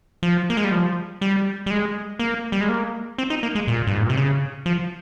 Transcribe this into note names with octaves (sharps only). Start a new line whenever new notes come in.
F3
A#3
G#3
G3
F3
G3
G3
G#3
A#3
G3
G#3
A#3
C4
D#4
A#3
G#3
A#2
G2
G#2
A#2
C3
C#3
F3